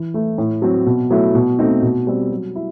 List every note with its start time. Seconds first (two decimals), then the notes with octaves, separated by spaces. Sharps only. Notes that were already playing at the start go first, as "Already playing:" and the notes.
Already playing: E3
0.14 A3 E4
0.38 A2
0.62 F#3 C4
0.86 B2
1.10 F#3 A3 E4
1.35 B2
1.59 A3 C4 D#4
1.82 B2
2.07 G3 C4
2.31 F#3
2.56 E4